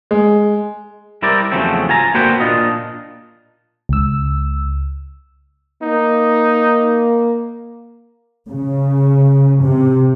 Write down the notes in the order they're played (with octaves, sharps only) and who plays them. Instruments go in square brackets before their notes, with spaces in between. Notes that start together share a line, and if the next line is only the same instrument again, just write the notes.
[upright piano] G#3
[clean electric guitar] G3 E4 A#4 C5 D5
E2 C#3 F3 F#3 A3 C4
F4 G#5 A#5
D3 A#3 F#4 B4 C5 G5
A#2 C#4 D4 F4 D#5
[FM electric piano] C#2 E6
[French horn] A#3 [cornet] D#4
[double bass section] C#3
C3